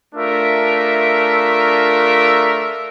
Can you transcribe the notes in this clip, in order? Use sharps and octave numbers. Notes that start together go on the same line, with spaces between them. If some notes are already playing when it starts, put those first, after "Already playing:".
A3 D4 F4 A#4 E5